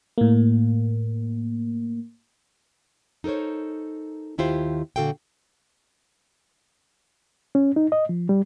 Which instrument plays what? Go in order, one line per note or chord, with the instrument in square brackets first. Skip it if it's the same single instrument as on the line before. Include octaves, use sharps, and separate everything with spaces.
[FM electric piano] A2 A#3
[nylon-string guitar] D#4 A4 A#4 C5 C#5
D#2 D#3 E4 F4 G4 C5
A#2 D3 F#4 A4 F5 G5
[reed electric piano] C#4
D#4
D#5
F3
G3